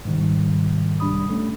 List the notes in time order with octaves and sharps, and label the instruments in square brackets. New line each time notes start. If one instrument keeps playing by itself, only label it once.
[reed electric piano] G#2 C3 D#3 G3
C2 G3 D4 B5 D#6
A3 C#4